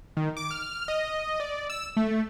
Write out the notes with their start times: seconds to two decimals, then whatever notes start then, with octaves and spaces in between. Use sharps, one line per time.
0.17 D#3
0.37 D6
0.51 F6
0.88 D#5
1.40 D5
1.70 E6
1.97 A3